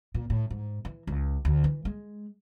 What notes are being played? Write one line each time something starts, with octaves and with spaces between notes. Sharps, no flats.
A#2
A2
G#2
E3
C#2
D2
E3
G#3